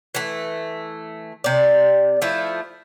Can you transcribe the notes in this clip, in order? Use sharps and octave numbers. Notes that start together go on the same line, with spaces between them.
E3 A3
C3 D5
F3 A3 E4